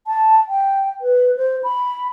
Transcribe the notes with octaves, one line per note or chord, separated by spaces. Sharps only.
A5
G5
B4
C5
B5